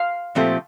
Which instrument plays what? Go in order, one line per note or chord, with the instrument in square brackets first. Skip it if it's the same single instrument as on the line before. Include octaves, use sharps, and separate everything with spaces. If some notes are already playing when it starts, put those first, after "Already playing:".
Already playing: [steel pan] F5
[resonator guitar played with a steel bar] A#2 F3 A3 C4 G4